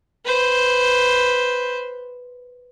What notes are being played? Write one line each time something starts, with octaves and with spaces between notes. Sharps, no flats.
B4 C5